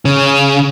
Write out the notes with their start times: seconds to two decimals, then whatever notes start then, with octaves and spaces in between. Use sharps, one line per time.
0.05 C#3